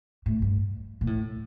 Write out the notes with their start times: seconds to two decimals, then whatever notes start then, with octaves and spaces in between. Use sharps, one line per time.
0.26 A2
0.42 G2
1.01 A#2
1.07 A2